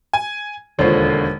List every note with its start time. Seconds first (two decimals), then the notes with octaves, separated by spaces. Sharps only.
0.13 G#5
0.79 E1 D#2 D3 F4 C5 C#5